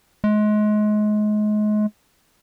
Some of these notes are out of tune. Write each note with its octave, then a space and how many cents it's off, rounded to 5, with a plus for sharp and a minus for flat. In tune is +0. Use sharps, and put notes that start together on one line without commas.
G#3 +30